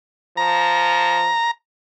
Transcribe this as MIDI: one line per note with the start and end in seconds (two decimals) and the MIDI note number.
0.37 1.32 53
0.37 1.51 82